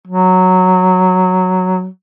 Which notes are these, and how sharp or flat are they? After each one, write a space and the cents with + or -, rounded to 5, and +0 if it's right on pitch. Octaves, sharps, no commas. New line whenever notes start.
F#3 -5